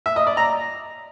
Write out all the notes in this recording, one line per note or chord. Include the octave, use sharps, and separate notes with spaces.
E5
D#5
D5
A#5